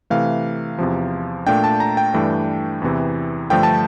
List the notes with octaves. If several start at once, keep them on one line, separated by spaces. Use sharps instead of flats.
C3 E3 A3 F5
E2 C3 F3
A#2 A3 D4 G5
A5
A#5
G5
G2 E3 A3 D4
E2 C3 E3
G2 D3 F3 A3 G5
A5